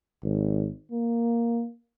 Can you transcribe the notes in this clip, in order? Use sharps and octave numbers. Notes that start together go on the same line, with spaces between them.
G#1
A#3